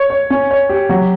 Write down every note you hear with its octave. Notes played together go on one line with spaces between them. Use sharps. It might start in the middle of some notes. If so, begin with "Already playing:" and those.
Already playing: C#5
C#5
C#4
C#5
G4
F#3